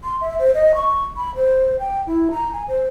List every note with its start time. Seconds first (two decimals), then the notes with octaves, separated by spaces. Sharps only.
0.04 C6
0.21 E5
0.39 C5
0.54 D#5
0.75 C#6
1.17 B5
1.35 C5
1.79 G5
2.07 E4
2.31 A#5
2.53 G#5
2.68 C5